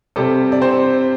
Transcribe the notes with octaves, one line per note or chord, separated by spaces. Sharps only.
C3 G3 C4 A4
D5
C4 C5